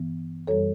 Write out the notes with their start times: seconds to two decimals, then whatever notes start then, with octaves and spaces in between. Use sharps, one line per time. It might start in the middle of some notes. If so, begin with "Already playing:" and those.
Already playing: G2 E3 B3
0.47 F#2 E3 G3 A4 C#5